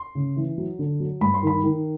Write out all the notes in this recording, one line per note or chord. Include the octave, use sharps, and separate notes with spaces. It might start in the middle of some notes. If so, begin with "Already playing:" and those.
Already playing: C6
C#3
E3
F#3
D3
F#3
G2 B5
C6
D#3 B5
D#3